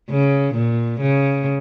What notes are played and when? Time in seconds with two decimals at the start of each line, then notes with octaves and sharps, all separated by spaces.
0.10 C#3
0.55 A#2
1.01 C#3